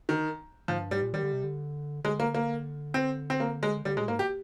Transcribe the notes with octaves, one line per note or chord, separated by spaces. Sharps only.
D#3
G#2 F3
G2
G#2 G3
A#2
D#3 G3
D3
C3
D3
D3 G#3
A#3
A#3
C4
C4
A#3
G#3
D3 G3
A#2 G#3
G#2 A#3
G4